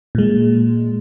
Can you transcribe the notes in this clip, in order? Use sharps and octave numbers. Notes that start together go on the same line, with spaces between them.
A#2 G#3